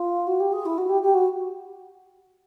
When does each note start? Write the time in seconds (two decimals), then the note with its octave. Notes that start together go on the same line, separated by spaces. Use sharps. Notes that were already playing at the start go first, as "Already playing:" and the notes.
Already playing: F4
0.27 F#4
0.40 G4
0.52 G#4
0.65 E4
0.78 F#4
0.89 G4
1.02 G4
1.14 F#4